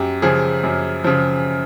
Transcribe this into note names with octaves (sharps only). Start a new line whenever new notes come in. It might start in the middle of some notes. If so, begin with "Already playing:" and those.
Already playing: F#2 G4
C#3 F3 G#4
F#2
C#3 F3